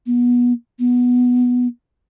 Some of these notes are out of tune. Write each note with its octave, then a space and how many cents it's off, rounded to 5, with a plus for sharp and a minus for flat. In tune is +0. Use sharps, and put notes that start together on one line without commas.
B3 -25
B3 -5